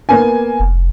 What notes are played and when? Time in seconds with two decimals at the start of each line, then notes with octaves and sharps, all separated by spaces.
0.09 A#3 B3 G#5
0.60 F1